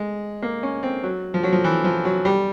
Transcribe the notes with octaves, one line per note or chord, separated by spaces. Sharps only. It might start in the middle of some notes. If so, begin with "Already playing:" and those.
Already playing: G#3
A#3
C#4
C4
F#3
F3
F#3
F3
E3
F3
F#3
G3